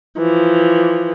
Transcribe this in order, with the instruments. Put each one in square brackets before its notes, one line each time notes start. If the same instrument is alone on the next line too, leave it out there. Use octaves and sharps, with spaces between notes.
[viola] E3 F3